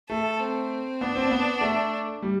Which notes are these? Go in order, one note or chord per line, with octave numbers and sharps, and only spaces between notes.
A3 A4
C4
B3 D4
C4
B3
A3
G3